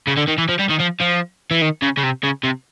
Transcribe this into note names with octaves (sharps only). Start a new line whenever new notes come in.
C#3
D3
D#3
E3
F3
G3
D#3
F3
F3
E3
D#3
C#3
C#3
C3
C#3
C3